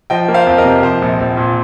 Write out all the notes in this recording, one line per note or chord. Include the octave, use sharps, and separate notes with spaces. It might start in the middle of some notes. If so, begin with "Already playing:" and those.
F3 D#5 G5
A#3
C5 F5
F2
A#4 D#5
C3
F3 C5
A#1
A#1
A#2